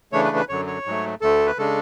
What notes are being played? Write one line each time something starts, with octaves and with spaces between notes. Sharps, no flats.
C#3 E3 A3 D4 C#5
B4
B4
F#2 D3 F#3 C#5
C#5
G#2 F#3 A3
D2 D3 A3 A4
B4
C#3 G#3 D4 A4